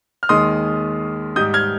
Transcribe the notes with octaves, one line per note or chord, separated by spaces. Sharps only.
F6
D#2 D#3 G#3 C6 D#6
G#2 G3 D#6 G6
F6 G#6